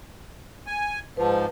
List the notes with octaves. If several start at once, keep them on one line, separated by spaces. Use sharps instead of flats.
G#5
G#2 F3 B4 A5